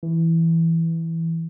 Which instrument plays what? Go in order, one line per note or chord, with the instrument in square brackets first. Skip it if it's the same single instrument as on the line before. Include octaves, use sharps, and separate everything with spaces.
[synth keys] E3